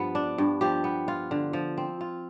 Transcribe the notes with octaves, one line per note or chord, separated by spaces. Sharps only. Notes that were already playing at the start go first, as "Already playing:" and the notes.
Already playing: G2 F3 B3 B4
D4
G2
F3 G4
B3
F4
D3
F3
C4
F4